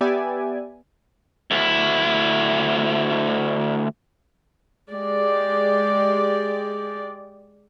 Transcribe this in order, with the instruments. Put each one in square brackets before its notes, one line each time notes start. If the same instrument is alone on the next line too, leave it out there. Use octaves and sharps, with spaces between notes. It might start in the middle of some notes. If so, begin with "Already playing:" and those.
[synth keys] B3 G4 D5 E5 G#5
[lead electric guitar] D2 E4
[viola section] G#3 G4 D5